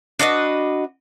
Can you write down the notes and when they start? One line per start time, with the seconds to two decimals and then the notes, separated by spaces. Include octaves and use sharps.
0.19 D4 F#4 B4 D#5